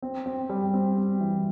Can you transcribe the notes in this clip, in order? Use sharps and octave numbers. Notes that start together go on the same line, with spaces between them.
C4
C4
G3
C4
C4
E3